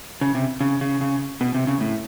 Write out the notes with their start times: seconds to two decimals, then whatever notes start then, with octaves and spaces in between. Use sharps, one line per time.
0.21 C#3
0.35 C3
0.61 C#3
0.81 C#3
1.01 C#3
1.41 B2
1.54 C3
1.67 C#3
1.80 A2